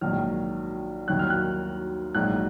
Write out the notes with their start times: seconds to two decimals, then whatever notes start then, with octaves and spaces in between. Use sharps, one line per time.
0.01 A#1 G#2 D#3 F#3 F6
1.08 D#2 D#3 F#3 F#6
1.19 F6
1.30 F#6
2.15 A#1 G#2 F#3 F#6